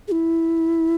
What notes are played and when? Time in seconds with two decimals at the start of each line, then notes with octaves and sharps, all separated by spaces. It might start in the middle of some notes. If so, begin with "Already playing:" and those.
0.08 G#4
0.12 E4